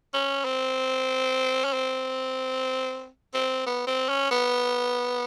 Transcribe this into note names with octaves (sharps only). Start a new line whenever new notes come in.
C#4
C4
C#4
C4
C4
B3
C4
C#4
B3